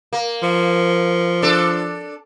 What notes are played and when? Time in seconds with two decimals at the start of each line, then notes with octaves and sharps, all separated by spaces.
0.13 A#3
0.43 F3
1.42 D4 A4